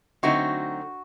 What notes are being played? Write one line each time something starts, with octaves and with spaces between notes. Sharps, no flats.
D3 F#3 A3 C4 D#4 F#4